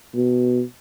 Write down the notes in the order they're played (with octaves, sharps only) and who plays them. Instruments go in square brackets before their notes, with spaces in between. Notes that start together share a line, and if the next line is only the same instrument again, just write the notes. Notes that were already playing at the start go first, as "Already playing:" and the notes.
[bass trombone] B2